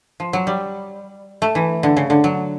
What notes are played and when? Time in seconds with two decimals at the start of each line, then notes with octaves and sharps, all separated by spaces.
0.20 F3
0.33 F#3
0.47 G3
1.42 A3
1.55 E3
1.83 D3
1.97 C#3
2.10 D3
2.24 F#3